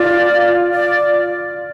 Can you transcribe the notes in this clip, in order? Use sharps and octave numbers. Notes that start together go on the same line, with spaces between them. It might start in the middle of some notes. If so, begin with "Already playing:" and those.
Already playing: F4 D5
D5